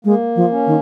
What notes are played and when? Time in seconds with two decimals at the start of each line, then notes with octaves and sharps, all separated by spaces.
0.05 G#3 A#3
0.36 F3
0.51 C#4
0.67 D#3